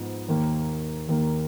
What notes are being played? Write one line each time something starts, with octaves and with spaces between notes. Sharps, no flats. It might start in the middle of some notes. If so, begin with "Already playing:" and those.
Already playing: G#2 F3 B3 D#4
D#2 D#3 A#3
D#2 D#3 A#3